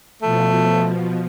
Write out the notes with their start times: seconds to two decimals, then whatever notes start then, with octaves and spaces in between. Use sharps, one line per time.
0.22 B2 F3 A3